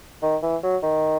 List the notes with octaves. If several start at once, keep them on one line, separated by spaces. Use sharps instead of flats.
D#3
E3
F#3
D#3